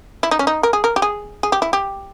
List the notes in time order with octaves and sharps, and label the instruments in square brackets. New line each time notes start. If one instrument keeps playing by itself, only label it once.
[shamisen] E4
D#4
C#4
D#4
A#4
G#4
A#4
G4
G#4
G#4
G4
E4
G4